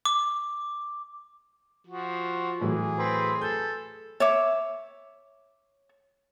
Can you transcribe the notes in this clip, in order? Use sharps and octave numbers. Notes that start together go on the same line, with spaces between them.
D6
F3 F#4
A2 E3 F#3 G#4
C4 B4
A4 G6
C#5 E5 D6